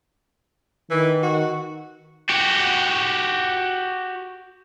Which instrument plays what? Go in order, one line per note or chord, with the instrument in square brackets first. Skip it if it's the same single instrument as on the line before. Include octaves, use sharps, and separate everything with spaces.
[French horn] D#3 [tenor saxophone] E3
[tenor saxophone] F#4
[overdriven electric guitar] F#4 G4